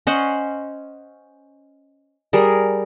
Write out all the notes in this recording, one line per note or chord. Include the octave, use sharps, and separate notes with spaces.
C#4 C5 D#5 F#5
G3 G#4 A#4